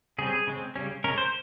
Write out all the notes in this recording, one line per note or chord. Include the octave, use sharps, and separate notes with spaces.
C#3 G3 C4 G#4
C#3 G#3 C4
C#3 G3 C#4
C#3 G#3 C#4 A#4
C5